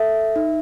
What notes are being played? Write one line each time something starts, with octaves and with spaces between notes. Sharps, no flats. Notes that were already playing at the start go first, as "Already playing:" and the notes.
Already playing: A4 E5
D#4